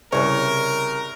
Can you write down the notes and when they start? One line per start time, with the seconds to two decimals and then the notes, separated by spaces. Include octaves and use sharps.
0.13 C2 C#3 A#4 C#5